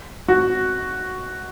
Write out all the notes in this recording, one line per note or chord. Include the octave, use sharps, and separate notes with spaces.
F#4